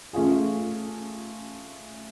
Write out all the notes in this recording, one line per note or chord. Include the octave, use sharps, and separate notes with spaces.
A3 C#4 F4 G#4